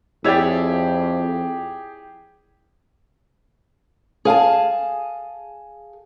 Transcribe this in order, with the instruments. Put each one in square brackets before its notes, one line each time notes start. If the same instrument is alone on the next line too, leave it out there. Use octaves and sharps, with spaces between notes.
[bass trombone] F2 [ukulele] E4 C#5 D5 [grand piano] G4 G#4
[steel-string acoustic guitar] G#4 F5 G#5 A5